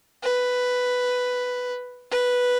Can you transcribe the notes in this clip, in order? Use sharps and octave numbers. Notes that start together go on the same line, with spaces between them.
B4
B4